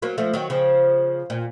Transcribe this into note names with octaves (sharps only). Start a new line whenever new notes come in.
F#3 A#3
F3 A3
D#3 F#3
C#3 F3
A#2